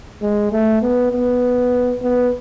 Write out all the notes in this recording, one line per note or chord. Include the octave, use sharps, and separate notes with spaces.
G#3
A3
B3
B3
B3